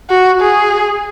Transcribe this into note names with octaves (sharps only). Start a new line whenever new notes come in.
F#4
G#4